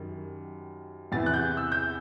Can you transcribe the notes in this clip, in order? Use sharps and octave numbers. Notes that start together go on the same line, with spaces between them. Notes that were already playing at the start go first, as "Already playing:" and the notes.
Already playing: F#2 D#3 G3
E2 C3 E3 B3 E4 A6
F#6
G6
E6
G6